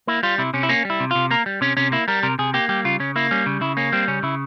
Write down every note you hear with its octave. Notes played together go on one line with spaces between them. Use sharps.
A#3 E4
G3 F4
C3 E4
C3 C#4
E4
A#3 C#4
G3 E4
C3
C3 F4
A#3 A#4
G3
C3 C#4
C3 C#4
A#3 E4
G3 A#4
C3 A#4
C3 G#4
A#3 G4
G3 G4
C#3 F4
C#3 C#4
A#3 E4
G3 C#4
C#3
C#3 E4
A#3 C#4
G3 C4
C#3 C#4
C#3 E4